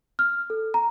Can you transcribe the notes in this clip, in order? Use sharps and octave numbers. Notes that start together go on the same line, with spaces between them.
F6
A4
A#5